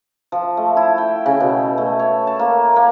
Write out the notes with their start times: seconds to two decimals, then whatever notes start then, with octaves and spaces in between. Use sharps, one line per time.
0.32 F3
0.57 A3
0.77 E4
0.98 G5
1.26 C#3
1.40 B2
1.78 A3
1.99 C#5
2.27 A5
2.39 A#3
2.76 A#3